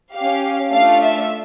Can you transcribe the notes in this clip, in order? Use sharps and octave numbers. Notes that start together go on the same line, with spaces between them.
C#4 G4 F5
A3 D4 F4 A4 F5
E5